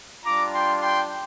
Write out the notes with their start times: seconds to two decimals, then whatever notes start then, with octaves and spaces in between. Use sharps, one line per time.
0.25 G3 D4 F4 A#5 D6
0.53 G5 C6
0.81 G5 C6